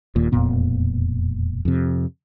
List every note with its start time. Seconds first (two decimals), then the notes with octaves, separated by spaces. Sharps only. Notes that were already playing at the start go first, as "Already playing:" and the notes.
0.16 D#1 D#2 A#2
0.32 E1 F2 A#2 B3
1.65 F2 C3